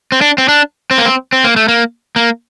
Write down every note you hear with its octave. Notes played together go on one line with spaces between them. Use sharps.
C4
D4
C4
D4
C4
A#3
C4
C4
A#3
A3
A#3
A#3